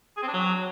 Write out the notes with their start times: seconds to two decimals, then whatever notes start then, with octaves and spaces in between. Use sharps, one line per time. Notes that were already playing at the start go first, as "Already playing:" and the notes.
0.17 G#4
0.22 C4
0.28 D4
0.33 F#3